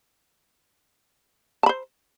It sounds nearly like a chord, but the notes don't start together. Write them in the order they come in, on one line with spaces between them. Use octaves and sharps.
A5 B5 C5